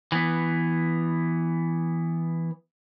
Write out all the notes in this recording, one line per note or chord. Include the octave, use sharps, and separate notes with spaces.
E3 B3